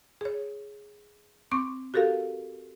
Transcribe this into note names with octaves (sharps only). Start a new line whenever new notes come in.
G#4 C#5
C4 C#6 D6
F#4 G4 A4 A#4 F5